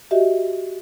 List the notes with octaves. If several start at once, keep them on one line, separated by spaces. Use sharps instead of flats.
F#4 G4 D#5 E5